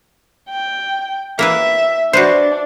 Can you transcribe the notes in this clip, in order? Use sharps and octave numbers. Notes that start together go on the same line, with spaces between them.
G5
A#3 E4 B4 E5
D4 F#4 B4 C5